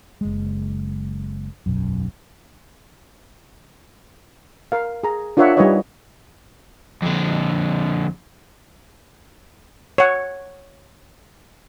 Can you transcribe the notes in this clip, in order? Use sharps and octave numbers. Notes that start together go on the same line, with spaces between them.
F#1 G#3
E1 B1 F#2
A#4 F5
G#4 A#5
D4 F4 A#4 C#5 E5 F#5
G3 D#4 F4 B4 C#5 D#5
F2 D3
C#5 F#5